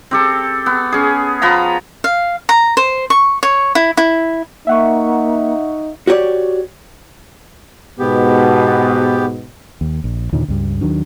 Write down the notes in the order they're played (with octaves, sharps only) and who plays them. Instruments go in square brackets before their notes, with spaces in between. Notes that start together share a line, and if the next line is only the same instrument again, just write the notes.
[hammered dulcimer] C4 G4 A4
B3
C#4 G#4
F3 B3 A#5 B5
[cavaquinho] F5
A#5
C5
C#6
C#5
E4
E4
[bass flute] A#3 [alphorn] D#4 [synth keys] E5 F#5 C#6
[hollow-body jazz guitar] F#4 G4 C#5 D5
[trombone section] G#2 B2 [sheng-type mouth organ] B3 G4
[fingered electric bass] D#2
A#1
D#2 A#2 D3 D#3
C#2 G2
D#2 D#3 F#3 D4